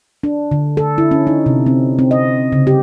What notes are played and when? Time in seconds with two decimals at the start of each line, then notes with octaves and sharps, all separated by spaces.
0.23 D4
0.51 D3
0.77 A4
0.98 E4
1.11 C#4
1.27 D#4
1.46 C3
1.66 C4
1.99 C4
2.11 D#5
2.52 C#3
2.67 G4